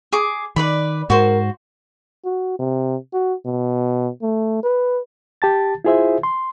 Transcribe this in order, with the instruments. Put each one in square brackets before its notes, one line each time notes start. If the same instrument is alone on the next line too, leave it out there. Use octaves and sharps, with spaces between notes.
[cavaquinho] G#4 D6
[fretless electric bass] D#3 [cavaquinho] B4 D5 B5
[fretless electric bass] G#2 [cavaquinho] F#4 C5 [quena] A#4
[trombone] F#4
C3
F#4
B2
A3
B4
[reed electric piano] G4 A5 A6
E4 F4 G#4 C5 E5
C6